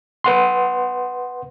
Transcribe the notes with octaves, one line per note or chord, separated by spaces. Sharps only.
B4 F#5 C6